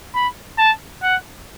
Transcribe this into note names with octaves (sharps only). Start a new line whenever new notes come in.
B5
A5
F#5